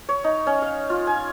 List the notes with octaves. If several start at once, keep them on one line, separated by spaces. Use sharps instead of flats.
C#5
D#4
C#4
F5
F4
G#5